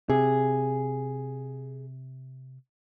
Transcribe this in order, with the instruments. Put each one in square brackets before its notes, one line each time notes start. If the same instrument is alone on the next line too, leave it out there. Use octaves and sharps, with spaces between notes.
[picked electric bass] C3 [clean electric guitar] G#4